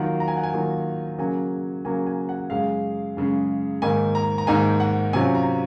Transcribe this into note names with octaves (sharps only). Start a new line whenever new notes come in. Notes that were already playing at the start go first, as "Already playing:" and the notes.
Already playing: D#3 F#3 A#3 F4 F#5
A#5
G#5
F#5
G#5
D#3 F#3 A#3 F4
C#3 F#3 A#3 G#5
C#3 F#3 A#3 G#5
G#5
F#5
F#2 C#3 G#3 F5
F#2 C#3 G#3
G#2 D#3 A#3 D#4 G#5
A#5
A#5
G#2 D#3 A#3 D#4 G#5
F#5
C3 F#3 C#4 F4 G#5
A#5